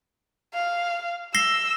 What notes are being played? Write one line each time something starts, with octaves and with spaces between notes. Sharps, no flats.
F5
E6 A#6 C7 G7